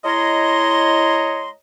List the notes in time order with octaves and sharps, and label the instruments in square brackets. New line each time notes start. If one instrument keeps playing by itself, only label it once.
[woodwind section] G#3 E4 C#5 D#5 A#5 C6